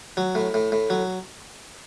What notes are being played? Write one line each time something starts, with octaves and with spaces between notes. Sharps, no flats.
F#3
A2
A2
A2
F#3